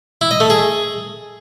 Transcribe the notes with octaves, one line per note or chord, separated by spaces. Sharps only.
E4
D#5
A3
G#4